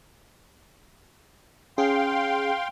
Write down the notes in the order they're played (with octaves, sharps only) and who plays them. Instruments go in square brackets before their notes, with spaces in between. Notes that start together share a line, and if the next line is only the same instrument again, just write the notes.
[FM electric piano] C#4 G#4 [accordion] F5 G5 C6